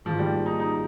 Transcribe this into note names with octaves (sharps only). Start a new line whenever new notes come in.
G#2 D#3 F3 A#3
G3
D#4
D#4